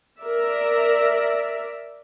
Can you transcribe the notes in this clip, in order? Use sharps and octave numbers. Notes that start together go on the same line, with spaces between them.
A#4 D5 E5